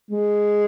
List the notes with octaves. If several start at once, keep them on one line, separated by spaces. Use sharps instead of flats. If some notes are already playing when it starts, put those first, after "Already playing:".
G#3